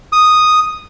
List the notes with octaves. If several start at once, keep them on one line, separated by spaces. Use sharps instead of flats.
D#6